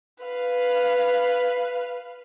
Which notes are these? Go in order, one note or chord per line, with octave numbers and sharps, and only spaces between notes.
B4 F5